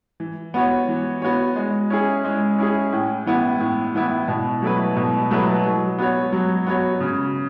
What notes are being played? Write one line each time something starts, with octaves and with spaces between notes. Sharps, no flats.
E3
B3 F#4 C#5
E3
B3 F#4 C#5
G#3
C#4 E4 G#4
G#3
C#4 E4 G#4
A2
E3 B3 E4
A2
E3 B3 E4
B2
F#3 A3 E4 B4
B2
F#3 A3 E4 B4
F#3
B3 F#4 C#5
F#3
B3 F#4 C#5
C#3